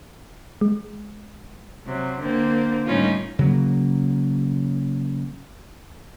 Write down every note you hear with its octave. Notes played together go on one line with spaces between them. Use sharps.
G#3
C3 F#3
D3 A#3 C4
A2 D#3 G3 C#4 D#4 F4
C#3 F#3 A#3